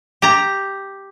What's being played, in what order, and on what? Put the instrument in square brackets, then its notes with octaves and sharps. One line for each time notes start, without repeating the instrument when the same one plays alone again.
[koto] G4 A#5